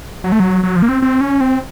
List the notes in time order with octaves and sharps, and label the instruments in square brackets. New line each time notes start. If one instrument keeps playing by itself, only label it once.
[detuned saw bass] F#3
A3
F#3
F#3
F3
A#3
C4
C4
C#4
C4